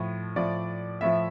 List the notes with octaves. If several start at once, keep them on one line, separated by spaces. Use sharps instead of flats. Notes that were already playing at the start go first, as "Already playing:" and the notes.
Already playing: A2 F3
A2 F3 D5
A2 F3 E5